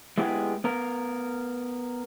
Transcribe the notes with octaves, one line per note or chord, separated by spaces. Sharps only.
G#3 B3 E4 G4 G#4
B3 A#4